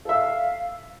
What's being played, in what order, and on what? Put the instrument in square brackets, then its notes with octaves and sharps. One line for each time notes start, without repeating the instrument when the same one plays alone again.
[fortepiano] A4 E5 [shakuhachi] F5